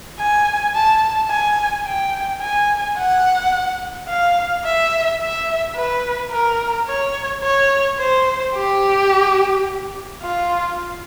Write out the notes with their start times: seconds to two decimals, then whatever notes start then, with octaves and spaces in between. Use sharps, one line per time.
0.19 G#5
0.75 A5
1.30 G#5
1.86 G5
2.42 G#5
2.97 F#5
4.09 F5
4.65 E5
5.20 E5
5.76 B4
6.32 A#4
6.88 C#5
7.43 C#5
7.99 C5
8.55 G4
10.22 F4